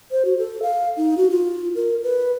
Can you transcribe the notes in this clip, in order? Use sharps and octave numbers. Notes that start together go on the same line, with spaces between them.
C5
F#4
A4
F5
D#4
F#4
F4
A#4
B4